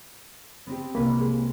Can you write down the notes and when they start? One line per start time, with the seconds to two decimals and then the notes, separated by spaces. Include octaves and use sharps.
0.67 B3 C4 G4
0.95 C2 A#3 B4 B5
1.18 G#3